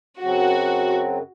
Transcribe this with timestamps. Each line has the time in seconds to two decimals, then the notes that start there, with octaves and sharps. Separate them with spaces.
0.21 F#2 C#3 F#3 C4 F#4